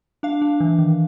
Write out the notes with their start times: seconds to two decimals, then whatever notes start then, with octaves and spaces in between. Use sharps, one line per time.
0.23 D4 F5
0.42 D4
0.60 E3
0.79 D#3